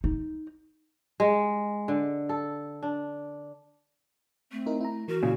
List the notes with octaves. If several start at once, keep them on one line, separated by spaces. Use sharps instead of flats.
D#4
G#3
D3
A4
D4
A3 C4
D#4 E4 A#4
E4 A#5
E3 F#4 A#4
A#2 C#3 E4